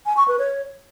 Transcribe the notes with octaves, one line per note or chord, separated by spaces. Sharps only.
G#5
C#6
B4
C#5